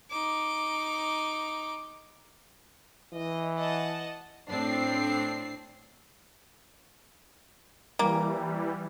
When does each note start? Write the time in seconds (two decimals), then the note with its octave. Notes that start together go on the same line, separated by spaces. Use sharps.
0.11 D#4 D6
3.13 E3 D#5
3.55 D#5 F#5 A5
4.48 A2 C4 D4 C7
7.99 E3 G3 A#3